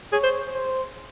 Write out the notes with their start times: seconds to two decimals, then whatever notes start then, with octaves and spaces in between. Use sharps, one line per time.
0.12 G#4 C#5
0.23 C5
0.54 C5